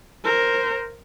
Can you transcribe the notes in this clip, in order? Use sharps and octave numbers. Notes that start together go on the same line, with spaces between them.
A#4 C5